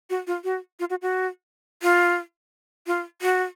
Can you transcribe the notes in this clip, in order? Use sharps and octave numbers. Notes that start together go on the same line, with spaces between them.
F#4
F4
F#4
F4
F#4
F#4
F4
F4
F#4